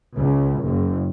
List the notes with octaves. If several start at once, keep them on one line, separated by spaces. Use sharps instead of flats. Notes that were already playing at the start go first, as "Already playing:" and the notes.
C#2
F#1